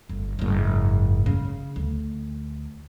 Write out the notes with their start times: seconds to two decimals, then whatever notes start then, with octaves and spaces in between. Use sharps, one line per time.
0.09 G1
0.39 F#1 G#2
1.26 C#3
1.76 D2